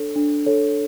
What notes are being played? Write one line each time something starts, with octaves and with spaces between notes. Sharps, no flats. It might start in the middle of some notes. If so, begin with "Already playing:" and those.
Already playing: D4 A4 C#5
D4
A4 C#5